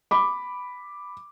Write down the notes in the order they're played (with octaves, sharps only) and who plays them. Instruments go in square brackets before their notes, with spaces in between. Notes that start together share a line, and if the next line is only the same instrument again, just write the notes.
[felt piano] B5 D6